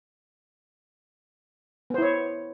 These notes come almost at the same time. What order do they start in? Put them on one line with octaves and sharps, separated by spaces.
B3 C5 E4 C#5